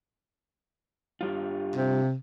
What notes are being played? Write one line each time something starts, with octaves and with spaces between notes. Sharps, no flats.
G2 G3 F4
C3